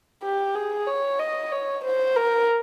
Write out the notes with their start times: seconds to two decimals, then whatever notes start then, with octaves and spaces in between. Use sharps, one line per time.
0.23 G4
0.55 G#4
0.87 C#5
1.19 D#5
1.52 C#5
1.84 C5
2.16 A#4